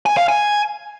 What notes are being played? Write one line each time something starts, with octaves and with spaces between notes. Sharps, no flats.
G#5
F5
G#5